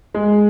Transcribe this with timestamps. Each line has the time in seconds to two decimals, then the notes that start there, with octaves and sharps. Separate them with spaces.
0.14 G#3